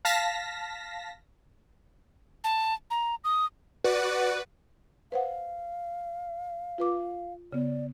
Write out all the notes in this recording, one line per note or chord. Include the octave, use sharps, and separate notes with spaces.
F5 A5 A#6 B6
A5
A#5
D#6
F#4 B4 D5 F#5
B4 C5 F5 F#5
F4 B4 D6
C#3 B3 D5